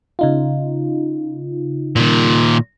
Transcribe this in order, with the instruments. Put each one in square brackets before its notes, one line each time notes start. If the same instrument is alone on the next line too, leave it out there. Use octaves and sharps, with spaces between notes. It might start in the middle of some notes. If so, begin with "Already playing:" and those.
[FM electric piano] C#3 D#4 F4
[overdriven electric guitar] A#2 D#3